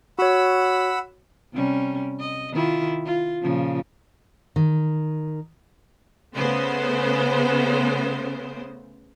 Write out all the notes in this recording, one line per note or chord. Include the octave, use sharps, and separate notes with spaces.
F#4 C#5 F#5 B5 E6
C3 G3 C#4
D#5
D#3 E4 F4
F4
A#2 C#3 F3
D#3
C#3 A3 B3 C5